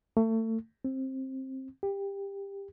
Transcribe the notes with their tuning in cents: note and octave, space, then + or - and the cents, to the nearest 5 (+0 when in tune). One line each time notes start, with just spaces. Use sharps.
A3 +30
C4 +15
G4 +20